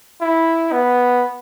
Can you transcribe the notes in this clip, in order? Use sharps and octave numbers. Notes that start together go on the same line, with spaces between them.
E4
B3